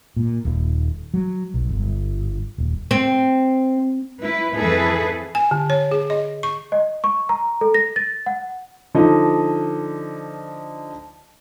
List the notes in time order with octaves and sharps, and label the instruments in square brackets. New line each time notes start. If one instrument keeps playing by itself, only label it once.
[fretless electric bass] A#2
D#1
F#3
B1
G1
D#1
[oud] C4
[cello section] E4 B4
F2 E3 E4 G#4 A4 B4
[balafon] G#5
D3
C#5
G#4
D#5
C#6
[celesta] D#5
C#6
A#5
A4
A#6
A6
F#5
[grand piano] D3 F3 D#4